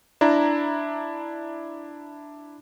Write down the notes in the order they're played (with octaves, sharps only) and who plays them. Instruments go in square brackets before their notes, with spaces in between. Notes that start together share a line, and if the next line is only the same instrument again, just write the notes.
[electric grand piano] D4 E4 A#5